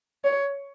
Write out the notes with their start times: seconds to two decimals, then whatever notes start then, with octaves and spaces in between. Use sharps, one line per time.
0.24 C#5